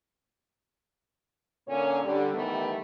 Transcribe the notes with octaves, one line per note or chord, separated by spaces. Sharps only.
A#2 D3 A#3 C#4 C#5
D3 G3
D#3 E3 G3 A3 B3